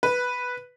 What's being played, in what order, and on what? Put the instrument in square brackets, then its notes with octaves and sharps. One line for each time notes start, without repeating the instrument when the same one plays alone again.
[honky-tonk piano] B4